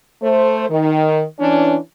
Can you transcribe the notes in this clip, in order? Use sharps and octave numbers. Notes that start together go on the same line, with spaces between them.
A3 C5
D#3
E3 C#4 D4